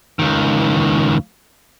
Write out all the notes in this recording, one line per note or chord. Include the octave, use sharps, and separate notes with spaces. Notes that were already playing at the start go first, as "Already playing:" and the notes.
C#2 D#3